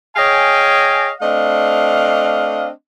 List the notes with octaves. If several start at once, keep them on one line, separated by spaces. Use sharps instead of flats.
G#4 C#5 D#5 F5 G5 G#5
A3 C4 D4 D#5 F5